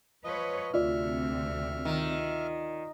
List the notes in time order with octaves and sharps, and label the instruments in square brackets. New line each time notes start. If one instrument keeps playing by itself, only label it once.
[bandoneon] F3 D#5 [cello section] B4 C#5
[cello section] D2 C3 C4 [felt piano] F4 D5 [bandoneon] E5 F6
[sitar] D#3